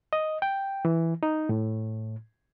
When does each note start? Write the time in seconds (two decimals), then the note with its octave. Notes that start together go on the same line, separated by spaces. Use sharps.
0.13 D#5
0.42 G5
0.85 E3
1.23 D#4
1.49 A2